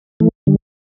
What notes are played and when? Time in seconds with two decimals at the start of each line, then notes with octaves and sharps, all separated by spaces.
0.20 E3 A3
0.47 D3 G3